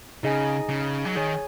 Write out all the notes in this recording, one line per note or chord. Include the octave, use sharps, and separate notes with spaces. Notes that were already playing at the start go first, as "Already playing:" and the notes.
C#3 D#4 G#4 D#5 G#5
C#3
F#3
D#3 G#4 C#5 G#5